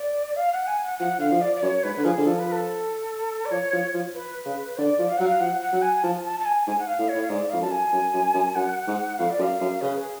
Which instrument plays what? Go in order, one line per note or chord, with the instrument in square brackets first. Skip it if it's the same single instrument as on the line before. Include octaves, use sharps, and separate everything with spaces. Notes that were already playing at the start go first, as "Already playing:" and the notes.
Already playing: [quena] D5
F5
F#5
G#5
F#5
[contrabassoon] F3 [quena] F#5
[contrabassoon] D3 [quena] F5
[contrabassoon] F3
[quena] D5
D5
[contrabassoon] F#2 [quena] C#5
[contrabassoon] G#2 [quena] B4
[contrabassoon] D3
[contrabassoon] F3 [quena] G#4
[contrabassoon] D3
[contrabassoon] F3 [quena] A4
[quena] B4
A4
D5
[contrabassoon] F3 [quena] C#5
[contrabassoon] F3
F3
[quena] B4
[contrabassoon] C#3
[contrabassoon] D3 [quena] D5
[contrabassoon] F3
[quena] F5
[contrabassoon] F#3 [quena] F#5
[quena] F5
[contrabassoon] F3 [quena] F#5
[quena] F#5
[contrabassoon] F#3
[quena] G#5
[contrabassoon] F3 [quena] A5
[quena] A5
A5
G#5
[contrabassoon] G#2 [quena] G#5
[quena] F#5
F5
[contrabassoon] A2
[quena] C#5
[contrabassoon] A2
[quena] F5
[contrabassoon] G#2 [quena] D5
[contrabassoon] F2 [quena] F5
[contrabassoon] F#2 [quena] A5
[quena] G#5
[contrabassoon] F#2
F#2
F#2
[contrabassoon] F#2 [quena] F#5
[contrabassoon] G#2
[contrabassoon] F2 [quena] F5
[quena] D5
[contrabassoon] F#2
[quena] F5
[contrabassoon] F#2
[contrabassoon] C#3 [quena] B4
[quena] G#4